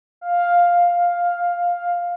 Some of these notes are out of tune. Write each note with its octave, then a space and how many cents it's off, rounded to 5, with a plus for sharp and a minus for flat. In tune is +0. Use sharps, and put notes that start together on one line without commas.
F5 +5